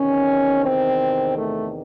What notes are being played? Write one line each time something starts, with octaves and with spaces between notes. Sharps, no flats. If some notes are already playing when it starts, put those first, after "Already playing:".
Already playing: E2 C3 D#3 C#4
C4
A3